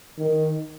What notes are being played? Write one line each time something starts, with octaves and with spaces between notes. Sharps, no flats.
D#3